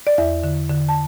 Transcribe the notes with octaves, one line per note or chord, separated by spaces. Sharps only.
D5
E2 E5
D3
D3
A5